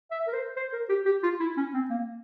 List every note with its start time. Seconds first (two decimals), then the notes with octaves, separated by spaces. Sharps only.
0.11 E5
0.27 A#4
0.33 C5
0.56 C5
0.73 A#4
0.89 G4
1.05 G4
1.23 F4
1.40 E4
1.57 C#4
1.74 C4
1.89 A#3